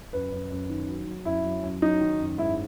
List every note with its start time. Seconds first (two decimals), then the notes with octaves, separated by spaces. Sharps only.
0.13 F#2 B4
0.32 F#2
0.51 F#2
0.70 D#3
0.89 F#3
1.07 F#3
1.25 F#2 E4
1.44 F#3
1.63 F#2
1.82 F#3 D#4
2.01 D#3
2.20 F#2
2.38 G#2 E4